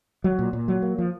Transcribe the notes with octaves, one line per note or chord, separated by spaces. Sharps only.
F#3
A#2
A#2
F#3
A#3
F3